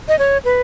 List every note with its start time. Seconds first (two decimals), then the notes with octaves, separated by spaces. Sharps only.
0.08 D#5
0.19 C#5
0.45 B4